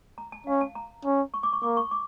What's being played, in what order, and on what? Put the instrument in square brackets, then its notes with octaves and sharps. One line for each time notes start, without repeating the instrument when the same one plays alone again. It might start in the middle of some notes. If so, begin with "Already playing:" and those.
[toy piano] A#5
A5
[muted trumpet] C#4 [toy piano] F5
[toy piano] A5
A#5
[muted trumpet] C#4
[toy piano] C#6
D6
C#6
[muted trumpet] A#3 [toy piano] D6
[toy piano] C#6
D6